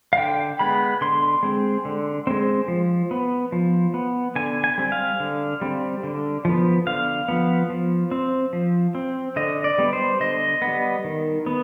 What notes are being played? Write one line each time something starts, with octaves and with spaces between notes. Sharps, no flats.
F5
D3 G5
G#3 B3 B5
D3 C6
G#3 C4
D3
G#3 C4
F3
B3
F3
B3
D3 G#5
G#5
G3 C4
F5
D3
G3 C4
D3
F3 B3
D3 F5
F3 B3
F3
C4
F3
C4
D3 D#5
D5
G3 B3
C5
D3 D#5
B3
G3
D#3
B3